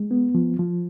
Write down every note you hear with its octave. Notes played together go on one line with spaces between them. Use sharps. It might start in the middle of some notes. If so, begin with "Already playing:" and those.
Already playing: G#3
B3
F3
F3